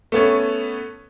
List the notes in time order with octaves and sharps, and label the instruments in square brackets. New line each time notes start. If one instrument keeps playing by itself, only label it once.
[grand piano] A3 B3 C#4